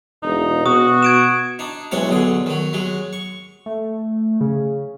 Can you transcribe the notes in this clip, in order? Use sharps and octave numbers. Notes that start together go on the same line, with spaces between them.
E1 D#4
B2 F#4 D#6
G#6 D7 E7
D4 D#4
B1 E3 G#3 C#4 F#5 G#5
B1 D3 G#4
D#3 F#3
F#3 G#3
C#6
A3
C#3